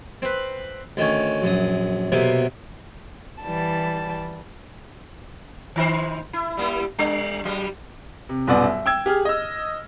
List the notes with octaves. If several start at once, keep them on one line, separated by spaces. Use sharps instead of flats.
C4 B4
D2 D#3 C#4
A#1 F#2 D#6
B1 C3 A#3 B3 A#4
E3 G3 A5
D#3 D#4 C5
E4
G3 A#3 E4
G3 D4
F#3 G3
C3
D#1 B1 F#2 B3 D5
E5
G5 E6 G#6
G4 G#4 F6
D#5 E6